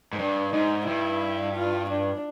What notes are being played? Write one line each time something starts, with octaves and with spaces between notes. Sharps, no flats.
G#2
G2 D4
G#2 D#4
G2 E4
F4
D4